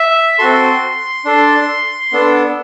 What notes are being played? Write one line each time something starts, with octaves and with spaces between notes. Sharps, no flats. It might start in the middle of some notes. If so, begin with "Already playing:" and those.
Already playing: E5
C4 F#4 A4 C6
D4 A4
B3 D4 A4